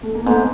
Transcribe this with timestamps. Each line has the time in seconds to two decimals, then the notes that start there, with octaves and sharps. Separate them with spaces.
0.03 A3
0.15 A#3
0.26 G#2 A3 B3